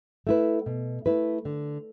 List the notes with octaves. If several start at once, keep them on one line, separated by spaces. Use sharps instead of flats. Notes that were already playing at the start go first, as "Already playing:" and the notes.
A3 E4 B4
B2
A3 E4 B4
D3